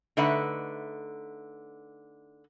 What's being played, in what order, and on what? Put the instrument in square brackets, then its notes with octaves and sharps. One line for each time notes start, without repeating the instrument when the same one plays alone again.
[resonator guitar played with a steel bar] D3 A3 D#4 B4 E5 F#5